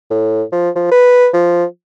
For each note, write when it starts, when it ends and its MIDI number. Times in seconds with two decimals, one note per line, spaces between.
0.11 0.43 45
0.52 0.70 53
0.75 0.88 53
0.92 1.28 71
1.33 1.65 53